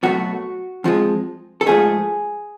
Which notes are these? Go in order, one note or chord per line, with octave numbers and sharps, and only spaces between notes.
B2 F#3 A3 F#4
F2 F3 G#3
A4
G#2 F3 A3 G#4